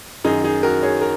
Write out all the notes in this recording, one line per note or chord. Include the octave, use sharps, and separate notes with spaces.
F#2 D#3 D#4 G#4
D#4 G#4
F#4 A#4
G#4 C#5
A#4